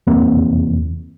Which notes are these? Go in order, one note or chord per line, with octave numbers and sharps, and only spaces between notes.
F1 E2 A#3 C4